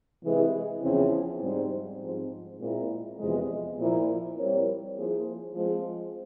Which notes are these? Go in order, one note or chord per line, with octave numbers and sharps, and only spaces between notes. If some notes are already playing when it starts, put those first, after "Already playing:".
C3 E3 G#3 E4 G#4
E2 C#3 F3 C4 E4
G#2 G3 C4
G#2 F3 C4
A#2 G#3 C4 E4 A#4
E2 C3 F3 G#3
A#2 F3 A#3 E4 A#4
G3 C4 E4 A#4 C#5
F3 A#3 E4 G#4 C5
F3 G#3 C4